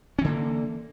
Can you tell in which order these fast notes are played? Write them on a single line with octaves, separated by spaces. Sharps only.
C#4 E3 D3 A#3